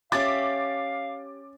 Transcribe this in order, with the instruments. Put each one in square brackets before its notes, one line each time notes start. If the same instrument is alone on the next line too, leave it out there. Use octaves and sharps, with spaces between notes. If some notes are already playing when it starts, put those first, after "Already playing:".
[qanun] C#4 G4 E5 [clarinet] F5 [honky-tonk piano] D6 A6